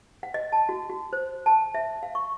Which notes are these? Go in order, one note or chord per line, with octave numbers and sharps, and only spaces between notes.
F#5
D#5
A5
F#4
F#4
C5
A5
E5
F5
C#6